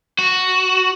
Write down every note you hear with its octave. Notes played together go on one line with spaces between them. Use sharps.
F#4